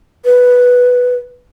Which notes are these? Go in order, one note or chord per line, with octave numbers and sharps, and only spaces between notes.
B4